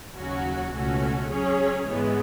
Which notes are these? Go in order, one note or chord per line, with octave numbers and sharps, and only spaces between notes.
D#2 C#3 F#3 C#4 F#4
C#2 B2 A3 C#4 F#4
F#3 C#4 G#4 C#5
G#2 E3 G#3 B3